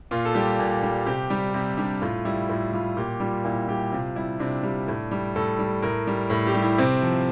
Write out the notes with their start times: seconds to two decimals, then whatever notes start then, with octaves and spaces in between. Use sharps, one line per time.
0.11 A#2 F4
0.25 A4
0.35 G3 G4
0.59 A#2
0.82 G3
1.06 C3 G4
1.30 G3
1.54 C3
1.77 G3 D4
2.01 A2 F4
2.25 G3 E4
2.49 A2 F4
2.73 G3 F4
2.97 A#2 G4
3.20 G3 F4
3.44 A#2 E4
3.68 G3 G4
3.92 C3 F4
4.15 G3 E4
4.39 C3 D4
4.63 G3
4.88 A2
5.11 G3
5.36 A2 A4
5.59 G3
5.82 A2 A#4
6.07 G3
6.30 A2
6.47 G4
6.54 G3
6.63 E4
6.78 C3 C4
7.02 F3